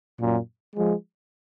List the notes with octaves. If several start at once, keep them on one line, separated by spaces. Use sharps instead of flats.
F#2 A#2
F3 G#3